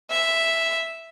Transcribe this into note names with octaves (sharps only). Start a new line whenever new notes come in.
E5